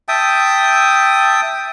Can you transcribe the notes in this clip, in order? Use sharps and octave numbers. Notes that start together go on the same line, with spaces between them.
E5 G5 A5 D#6